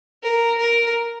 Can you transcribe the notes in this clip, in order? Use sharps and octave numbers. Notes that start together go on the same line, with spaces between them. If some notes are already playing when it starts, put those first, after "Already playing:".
A#4
A#4